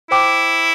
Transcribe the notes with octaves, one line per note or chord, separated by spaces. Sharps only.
E4 C5 G5 D6